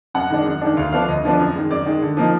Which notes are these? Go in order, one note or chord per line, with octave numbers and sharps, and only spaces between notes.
F#2 F#5
D#3 G#3 D4
F#2
D#3 G#3 D4
D2 F5
D3 F3 B3 D4 F5
D2 D#5
D3 F3 B3 D4
F#2
D#3 G#3
F#2 D5
D#3 G#3
D3
F3 A#3 D#4